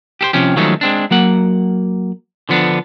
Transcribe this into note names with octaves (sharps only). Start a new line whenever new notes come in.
G4 A4 C5
C3 F3 C#4 G4
D#3 F3 F#3 G#3 A3 C#4
G#3 C4 D4
F#3 A#3 F#5
D3 F3 B3 D4